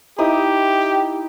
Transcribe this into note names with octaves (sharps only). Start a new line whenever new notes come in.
D#4 E4 G4 D#6